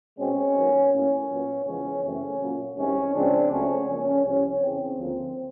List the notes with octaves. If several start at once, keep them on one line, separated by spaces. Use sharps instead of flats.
B2 G#3 C4 C#4
D#2 D#3 F#3 B3
A2 F#3 A#3 C#4
A#2 F#3 B3
E2 C#3 F3 G#3 B3 C#4
F#2 C#3 E3 A3 C4 C#4
A#2 F#3 A#3
C2 C3 D#3 G#3 C#4
C#2 C#3 F3 G#3 C4 D4
C#2 C#3 F#3 A3 C4 C#4
F2 C#3 F3 A#3 C#4
C2 C3 F3 C#4
E2 C#3 E3 C4
D2 D3 F3 A#3